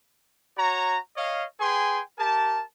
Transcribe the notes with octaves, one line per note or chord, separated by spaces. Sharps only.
F#4 C#5 A#5
C#5 D#5 F5
G#4 B4 G5 G#5 C6
G4 A#4 A5